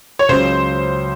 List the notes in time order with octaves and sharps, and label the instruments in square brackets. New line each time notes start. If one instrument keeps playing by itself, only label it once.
[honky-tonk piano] C#5
[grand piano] C#2 C#3 F#3 [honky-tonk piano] C5